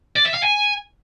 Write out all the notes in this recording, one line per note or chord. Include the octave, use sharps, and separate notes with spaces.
D5
E5
F5
G#5